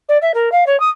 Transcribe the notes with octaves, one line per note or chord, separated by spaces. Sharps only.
D5
E5
A#4
F5
C#5
D#6